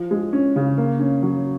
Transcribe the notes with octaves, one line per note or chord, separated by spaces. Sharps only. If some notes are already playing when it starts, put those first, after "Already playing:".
Already playing: F3
G#3
C#4
C#3
A#3
C#4
F#3